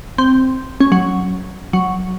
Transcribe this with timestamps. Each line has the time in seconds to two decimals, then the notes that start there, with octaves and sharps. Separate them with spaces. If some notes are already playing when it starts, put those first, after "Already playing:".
0.18 C4
0.81 C#4
0.92 F#3
1.73 F#3